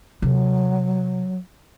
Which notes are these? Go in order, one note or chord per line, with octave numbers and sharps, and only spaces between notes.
C3 F#3